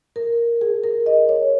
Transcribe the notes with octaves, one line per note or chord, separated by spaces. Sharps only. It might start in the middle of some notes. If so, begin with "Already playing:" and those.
A#4
G#4
A#4
D#5
C#5